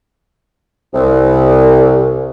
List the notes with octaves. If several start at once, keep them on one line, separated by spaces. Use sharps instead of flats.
C2